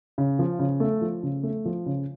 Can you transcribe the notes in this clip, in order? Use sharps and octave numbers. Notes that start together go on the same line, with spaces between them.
C#3
F3
C#3
A3
F3
C#3
A3
F3
C#3